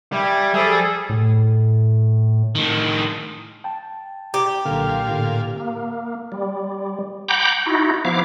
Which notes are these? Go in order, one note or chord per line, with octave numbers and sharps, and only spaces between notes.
G3 E5 G5 G#5
F3 G3 G#4 A4
A2
A2 D#3
G5 A5
G4 A#5
B1 A#2 D3 F5
A2 D3
A#3
G3
F#5 G5 A#5 B5 D6 G6
D#4 E4 F#4
F3 B3 E4 F5 D6